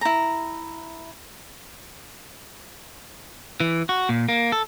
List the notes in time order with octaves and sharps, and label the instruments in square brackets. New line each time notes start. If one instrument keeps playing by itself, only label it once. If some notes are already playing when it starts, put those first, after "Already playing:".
[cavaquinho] E4 A#5
[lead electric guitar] E3
F#4
A#2
A#3
A4